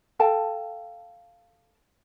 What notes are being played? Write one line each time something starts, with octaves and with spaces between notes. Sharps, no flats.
A4 F5 G5 A5